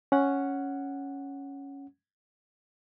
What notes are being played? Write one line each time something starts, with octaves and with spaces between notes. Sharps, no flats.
C#4 F#5